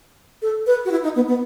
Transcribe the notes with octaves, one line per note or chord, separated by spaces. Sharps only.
A4
B4
F#4
E4
D#4
B3
B3